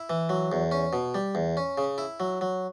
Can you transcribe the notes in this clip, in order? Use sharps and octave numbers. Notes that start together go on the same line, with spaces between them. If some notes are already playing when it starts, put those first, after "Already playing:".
Already playing: E4
E3
F#3
E2
C#4
B2
G3
E2
C#4
C#3
E4
F#3
F#3